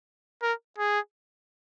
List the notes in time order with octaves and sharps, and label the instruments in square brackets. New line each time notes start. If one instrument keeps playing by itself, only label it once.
[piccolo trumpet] A#4
G#4